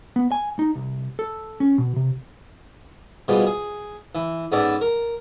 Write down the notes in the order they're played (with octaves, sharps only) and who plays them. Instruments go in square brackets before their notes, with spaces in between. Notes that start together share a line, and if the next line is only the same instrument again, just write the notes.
[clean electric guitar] B3
G#5
D#4
C2
A4
C#4
B2
C3
[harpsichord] B2 F3 G3 G#3
G#4
E3
G#2 B3 C#4 A4 D5
A#4